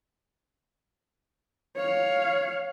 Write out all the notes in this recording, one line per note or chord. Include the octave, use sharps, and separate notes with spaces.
C#5 F5